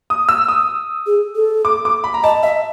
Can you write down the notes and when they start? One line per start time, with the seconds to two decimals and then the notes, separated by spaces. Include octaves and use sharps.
0.10 D#6
0.29 E6
0.48 D#6
1.07 G#4
1.36 A4
1.65 D6
1.85 D6
2.04 B5
2.14 A#5
2.23 D#5 A5
2.43 D#5 E5